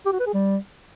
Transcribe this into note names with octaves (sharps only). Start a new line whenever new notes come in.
G4
F#4
B4
G#4
G3